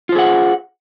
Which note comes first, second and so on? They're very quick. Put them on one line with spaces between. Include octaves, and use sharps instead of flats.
F4 C5 G#4 F#5